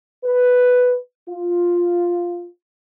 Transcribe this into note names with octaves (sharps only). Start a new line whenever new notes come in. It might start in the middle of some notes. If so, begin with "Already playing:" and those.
B4
F4